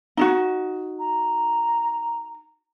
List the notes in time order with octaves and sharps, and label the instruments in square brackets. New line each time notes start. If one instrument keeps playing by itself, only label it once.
[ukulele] D#4 E4 F#4
[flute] A#5